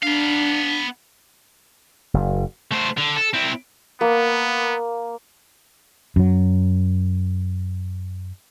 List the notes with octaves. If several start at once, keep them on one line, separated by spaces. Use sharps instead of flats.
B3 D4 F5
F#1
A3 C5
D3
A4
C4 E4
A#3 B3
F#2 F#3